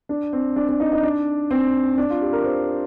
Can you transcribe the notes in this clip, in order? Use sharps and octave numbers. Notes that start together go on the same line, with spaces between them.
D4
C4
D4
D4
D#4
D#4
D4
C4
D4
F4
G4
A#4
C5